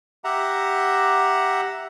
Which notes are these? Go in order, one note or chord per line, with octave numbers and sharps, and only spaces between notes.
G4 E5 F#5 A#5